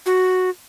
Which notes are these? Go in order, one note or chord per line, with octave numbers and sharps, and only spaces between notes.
F#4